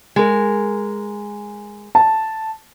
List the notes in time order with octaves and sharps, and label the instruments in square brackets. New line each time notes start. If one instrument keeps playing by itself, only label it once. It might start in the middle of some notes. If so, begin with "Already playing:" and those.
[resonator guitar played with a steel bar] G#3 A#4
[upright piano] A5